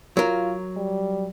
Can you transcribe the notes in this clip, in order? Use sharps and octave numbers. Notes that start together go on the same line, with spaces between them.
F#3 F4 A#4
G3